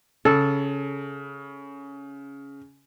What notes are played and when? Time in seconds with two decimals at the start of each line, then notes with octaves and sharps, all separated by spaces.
0.25 C#3 A4